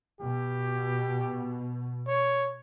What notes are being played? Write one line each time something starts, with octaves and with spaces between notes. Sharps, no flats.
B2 G4
C#5